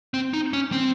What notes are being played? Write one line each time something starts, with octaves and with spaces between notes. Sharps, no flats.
C4
D#4
C#4
C4